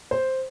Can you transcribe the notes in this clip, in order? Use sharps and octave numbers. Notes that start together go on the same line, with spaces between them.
C5